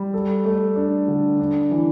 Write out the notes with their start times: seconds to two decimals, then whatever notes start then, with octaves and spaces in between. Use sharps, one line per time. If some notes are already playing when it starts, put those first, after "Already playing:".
Already playing: G3
0.14 A4
0.45 A3
0.76 D4
1.08 D3
1.40 D4
1.71 E3